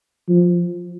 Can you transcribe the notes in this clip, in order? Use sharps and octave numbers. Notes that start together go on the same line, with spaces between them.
F3